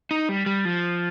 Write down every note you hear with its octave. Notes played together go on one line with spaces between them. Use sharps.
D#4
G3
G3
F3